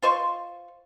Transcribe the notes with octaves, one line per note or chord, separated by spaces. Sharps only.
F4 C5 D#5 C#6